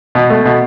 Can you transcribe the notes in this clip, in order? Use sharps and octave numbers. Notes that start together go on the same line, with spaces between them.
B2
A3
B2